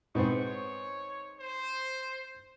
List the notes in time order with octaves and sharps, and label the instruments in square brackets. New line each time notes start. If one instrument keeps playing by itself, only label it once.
[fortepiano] G#2 B3 C4 [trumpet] C#6
[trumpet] C#5
C5